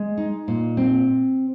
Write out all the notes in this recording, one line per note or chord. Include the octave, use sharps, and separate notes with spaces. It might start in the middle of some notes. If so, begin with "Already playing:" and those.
Already playing: G#3
D#4
A#2
C4